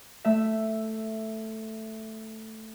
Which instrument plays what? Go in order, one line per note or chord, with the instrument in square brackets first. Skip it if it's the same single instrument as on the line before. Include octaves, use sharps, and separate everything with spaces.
[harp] A3 E5